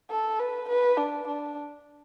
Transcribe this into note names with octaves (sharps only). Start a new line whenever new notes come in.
A4
B4
B4
D4
D4